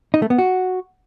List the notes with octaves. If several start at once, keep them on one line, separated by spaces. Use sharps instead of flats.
D#4
A3
B3
F#4